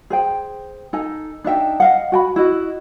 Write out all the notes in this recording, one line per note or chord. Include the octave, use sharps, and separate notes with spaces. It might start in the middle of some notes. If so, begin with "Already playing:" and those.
G#4 C5 G5
D#4 A4 G#5
D4 D#4 E5 G5
D#5 F5 F#5
F#4 G5 B5
E4 F#4 D#5